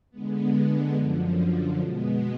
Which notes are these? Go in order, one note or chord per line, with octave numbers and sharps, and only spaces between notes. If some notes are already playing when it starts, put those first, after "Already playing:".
D3 G#3 B3
F#2 D3 F3
B2 G#3 B3